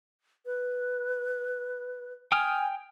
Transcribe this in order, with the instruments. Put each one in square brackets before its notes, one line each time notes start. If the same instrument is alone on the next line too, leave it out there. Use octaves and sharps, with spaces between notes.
[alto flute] B4
[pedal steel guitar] G5 D#6 F6 [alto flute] G#5